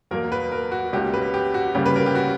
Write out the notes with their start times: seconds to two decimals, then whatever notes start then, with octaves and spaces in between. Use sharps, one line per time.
0.11 E2 B2 F#3 A#3 A#4
0.32 B4
0.52 A#4
0.72 F#4
0.93 C#2 B2 A#3 C#4 G4
1.14 B4
1.34 G4
1.54 F#4
1.74 D2 C#3 G3 A#3 C#4 G4
1.86 B4
1.96 A#4
2.06 G4
2.15 F#4